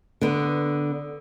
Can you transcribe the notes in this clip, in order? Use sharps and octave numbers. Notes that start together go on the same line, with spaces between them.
D3 B3